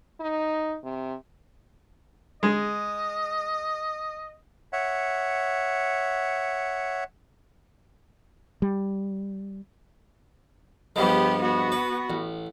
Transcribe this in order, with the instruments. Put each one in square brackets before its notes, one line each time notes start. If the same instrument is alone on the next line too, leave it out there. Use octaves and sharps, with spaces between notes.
[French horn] D#4
C3
[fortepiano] G#3 [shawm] D#5
[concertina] C#5 E5 F#5
[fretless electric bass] G3
[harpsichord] G2 F3 G#3 [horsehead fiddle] B3 G4
[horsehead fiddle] B3 F#4
[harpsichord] B4
A1